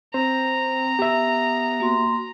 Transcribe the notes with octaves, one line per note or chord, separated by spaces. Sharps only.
C4 C5 A#5
B3 G4 E5
A#3 F#4 C6